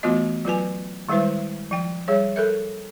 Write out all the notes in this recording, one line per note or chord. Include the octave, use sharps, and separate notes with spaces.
E3 A3 B3 F4 F#4 D#5
F#3 F4 B4 G#5
D#3 G3 G#3 E4 B4 C5
F3 G5
G3 G#4 C#5
A4 A#4 E5